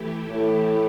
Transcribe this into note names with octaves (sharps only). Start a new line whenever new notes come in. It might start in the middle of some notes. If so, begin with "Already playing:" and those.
Already playing: E3 A3 E4 G4
A2